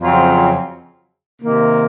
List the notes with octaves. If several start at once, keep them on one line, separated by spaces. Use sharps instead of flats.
F2 C#3 F#3 C4 F4
C3 D#3 A#3